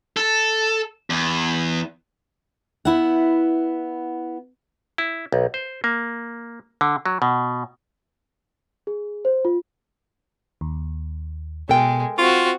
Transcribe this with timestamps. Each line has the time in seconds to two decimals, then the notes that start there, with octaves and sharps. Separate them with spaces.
0.17 A4
1.10 E2
2.85 B3 E4 F#5
4.98 E4
5.32 B1
5.54 C5
5.84 A#3
6.81 D3
7.06 F#3
7.22 B2
8.87 G#4
9.25 C5
9.45 F4
10.61 D#2
11.69 B2 G#3 A4 A#4 G5
12.18 C4 F4 F#4 C#6